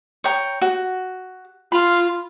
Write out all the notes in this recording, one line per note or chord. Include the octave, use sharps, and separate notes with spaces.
C#5 G5 A#5
F#4
F4 B5